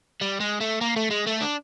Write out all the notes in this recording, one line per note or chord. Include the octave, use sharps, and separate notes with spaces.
G3
G#3
A3
A#3
A3
G#3
A3
D4